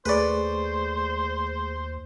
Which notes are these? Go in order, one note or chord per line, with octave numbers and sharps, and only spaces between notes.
D#2 A3 G#4 B4 C5 D5 C#6